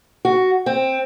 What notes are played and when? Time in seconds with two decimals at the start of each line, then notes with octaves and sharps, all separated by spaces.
0.25 F#4
0.66 C4